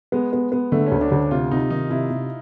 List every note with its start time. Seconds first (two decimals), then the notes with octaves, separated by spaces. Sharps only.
0.12 G#3 B3
0.33 B3
0.52 B3
0.72 D3 A3
0.87 C#4
0.92 D2
1.01 D4
1.12 D2
1.31 C3 F4
1.51 C3 D#4
1.70 D#3 D#4
1.90 C3 E4
2.10 C3